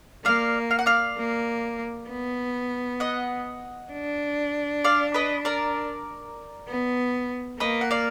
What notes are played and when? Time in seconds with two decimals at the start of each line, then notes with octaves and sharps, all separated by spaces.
0.25 A#3 D5 F5
0.71 F5
0.79 F#5
0.86 D5 F5
1.17 A#3
2.09 B3
3.00 D#5 F#5
3.92 D4
4.84 D5 F5
5.14 B4 D#5
5.45 A#4 D5
6.68 B3
7.60 A#3 B4 D#5
7.81 F#5
7.91 D5 F5